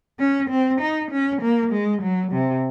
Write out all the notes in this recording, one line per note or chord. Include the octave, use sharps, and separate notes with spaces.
C#4
C4
D#4
C#4
A#3
G#3
F#3
C3